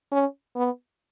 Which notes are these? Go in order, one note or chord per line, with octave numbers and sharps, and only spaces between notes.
C#4
B3